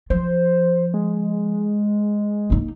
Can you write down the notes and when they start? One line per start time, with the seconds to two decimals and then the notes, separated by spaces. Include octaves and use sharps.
0.10 F3 C5
0.94 G#3
2.50 A#3 D#4